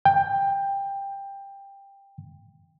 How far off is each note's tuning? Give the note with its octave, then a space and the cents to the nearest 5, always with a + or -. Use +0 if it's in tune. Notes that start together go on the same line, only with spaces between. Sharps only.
G5 +15